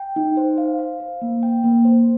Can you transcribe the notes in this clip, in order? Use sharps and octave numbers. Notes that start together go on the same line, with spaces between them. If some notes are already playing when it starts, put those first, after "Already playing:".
Already playing: G5
D#4
C5
F5
F5
C5
A#3
G5
A#3
C5